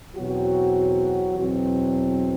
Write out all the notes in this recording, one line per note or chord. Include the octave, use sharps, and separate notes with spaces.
E2 B2 F#3 C4 F#4
E2 B2 F#3 C4